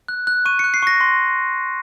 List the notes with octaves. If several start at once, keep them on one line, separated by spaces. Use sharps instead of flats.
F#6
F#6
C#6 D#7
C#7
F#6
C7
C#6 A#6
C6